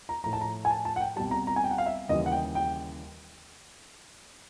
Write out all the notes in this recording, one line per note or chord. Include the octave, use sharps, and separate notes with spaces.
A#5
A2 F3 A#5
A5
A#5
G#5
A5
A5
F#5
G5
C2 B2 G3 A5
A#5
A#5
G#5
G5
F#5
F5
E5
D#2 C#3 E3 G3 D#5
F#5
G5
G5